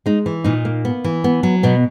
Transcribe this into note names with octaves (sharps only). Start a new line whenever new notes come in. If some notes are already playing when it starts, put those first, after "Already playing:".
G#3 D#4
E3
A#2 D#4
A#3
B3
E3
B3
F#3
B2 B3